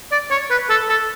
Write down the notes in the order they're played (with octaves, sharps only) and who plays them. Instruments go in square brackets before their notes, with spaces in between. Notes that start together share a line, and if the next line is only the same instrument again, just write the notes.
[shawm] D5
C#5
B4
A4
A4